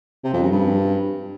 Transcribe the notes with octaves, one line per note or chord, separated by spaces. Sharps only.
C3
F2
F#2
G2